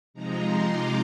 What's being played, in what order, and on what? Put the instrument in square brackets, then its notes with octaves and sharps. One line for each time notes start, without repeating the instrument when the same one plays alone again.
[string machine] C3 F3 G#3 D#4 A#5
C6
D6